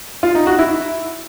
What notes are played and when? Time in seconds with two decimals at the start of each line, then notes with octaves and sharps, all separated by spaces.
0.23 F4
0.35 D#4
0.47 F#4
0.59 E4